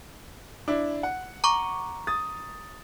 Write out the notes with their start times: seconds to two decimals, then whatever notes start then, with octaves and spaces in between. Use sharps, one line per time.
0.68 D4 E4
1.03 F#5
1.44 A#5 C#6 D6
2.07 D#6 A6